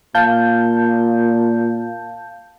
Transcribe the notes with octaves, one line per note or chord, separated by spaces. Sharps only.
A#2 F5 A5 G6